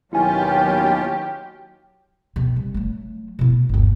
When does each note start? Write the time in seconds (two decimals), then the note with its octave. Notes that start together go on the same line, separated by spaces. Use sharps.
0.13 D#2 B2 F#3 C#4 E4 F4 G4 G#5
2.36 B2 D#3
2.56 C2
2.74 F#3 A3
3.39 B2 E4
3.69 G1 D#2